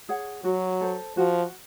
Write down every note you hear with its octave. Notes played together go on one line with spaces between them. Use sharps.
G#4 C#5 F#5
F#3 F#4
A4 C5
F3 F#4